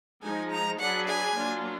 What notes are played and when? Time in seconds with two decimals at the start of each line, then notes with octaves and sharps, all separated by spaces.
0.23 F3 G#3 D#4 G#5
0.50 A#5
0.79 F#3 D4 G#4 B4 D5 F#5
1.08 G#5
1.36 F#3 A#3 D4 F4